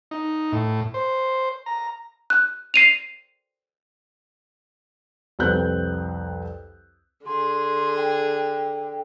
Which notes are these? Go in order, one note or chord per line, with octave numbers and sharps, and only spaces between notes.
D#4
A2
C5
A#5
F#6
C7 D#7 F7
C2 F2 C4 B4 F#6 G6
D3 G#4 C6
G5